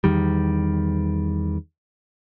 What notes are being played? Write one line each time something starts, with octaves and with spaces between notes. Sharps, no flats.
E2 D#3 G3